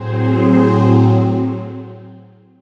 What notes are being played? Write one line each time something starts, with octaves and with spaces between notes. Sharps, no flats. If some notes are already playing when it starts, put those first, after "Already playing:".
Already playing: A2 F#3 C4 G#4 C5
G#4 C5